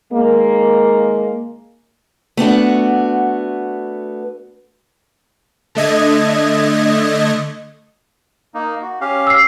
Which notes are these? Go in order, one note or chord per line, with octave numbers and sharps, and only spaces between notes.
D#3 G#3 A#3
A3 B3 D4 F#4
D3 A3 D#5 G#6
A#3 D#4
F#4
C#4 G4 F5
E6 C7